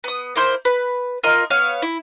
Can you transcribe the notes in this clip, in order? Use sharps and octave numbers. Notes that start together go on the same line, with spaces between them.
B3 D#6
A#3 E4 C5 G6
B4
F4 A#4 D#5
B3 C#5 F5
E4